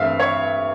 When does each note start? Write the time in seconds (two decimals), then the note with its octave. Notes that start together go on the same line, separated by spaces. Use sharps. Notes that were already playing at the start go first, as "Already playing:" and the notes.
Already playing: G2 E3 A3 C4 E5 F5
0.19 C#5